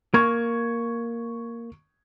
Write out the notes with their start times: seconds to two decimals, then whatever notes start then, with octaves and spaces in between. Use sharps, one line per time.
0.14 A#3 C#6 G#6